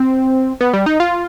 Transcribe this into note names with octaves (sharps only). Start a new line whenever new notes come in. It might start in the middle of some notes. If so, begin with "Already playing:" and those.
Already playing: C4
B3
G3
D#4
F4